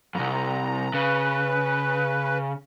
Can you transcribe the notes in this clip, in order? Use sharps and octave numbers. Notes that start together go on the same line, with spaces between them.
C2 F2 A#5
C#3 B4